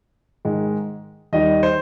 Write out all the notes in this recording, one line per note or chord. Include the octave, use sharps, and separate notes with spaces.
G#2 D#3 G#3
D#2 D#3 G3 D#5
C5